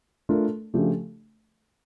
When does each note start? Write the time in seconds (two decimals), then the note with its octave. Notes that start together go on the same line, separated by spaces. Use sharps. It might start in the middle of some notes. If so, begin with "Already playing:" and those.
0.29 A3 D4 F4 A#4
0.74 C#3 F3 A3 D4 G4